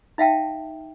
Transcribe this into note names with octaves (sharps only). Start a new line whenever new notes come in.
D#4 E5 F5 G5 A5